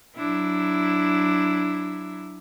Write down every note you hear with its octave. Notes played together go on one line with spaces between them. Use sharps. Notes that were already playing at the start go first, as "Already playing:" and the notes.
F#3 D4 E4